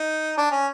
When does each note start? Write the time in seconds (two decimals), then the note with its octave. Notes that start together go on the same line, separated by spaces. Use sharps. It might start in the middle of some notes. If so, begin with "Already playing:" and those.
Already playing: D#4
0.37 D4
0.51 C#4